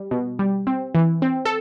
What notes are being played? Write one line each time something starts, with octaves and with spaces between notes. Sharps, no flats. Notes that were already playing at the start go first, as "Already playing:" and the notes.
Already playing: G3
B2
G3
C4
E3
C4
A4